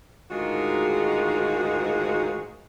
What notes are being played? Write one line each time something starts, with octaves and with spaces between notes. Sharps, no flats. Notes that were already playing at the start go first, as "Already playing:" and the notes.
D2 G#2 D#3 G#3 F4 F#4